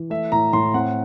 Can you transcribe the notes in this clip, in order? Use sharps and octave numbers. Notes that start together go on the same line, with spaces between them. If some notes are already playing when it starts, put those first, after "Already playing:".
Already playing: E3
A3 E5
A2 A#5
A2 C6
C4 F#5